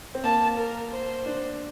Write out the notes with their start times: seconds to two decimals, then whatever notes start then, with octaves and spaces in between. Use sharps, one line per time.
0.15 C4
0.23 A#3 A5
0.58 A#4
0.92 C5
1.26 D4